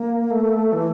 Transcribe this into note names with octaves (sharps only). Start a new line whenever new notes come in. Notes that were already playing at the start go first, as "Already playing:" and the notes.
Already playing: A#3
A3
E3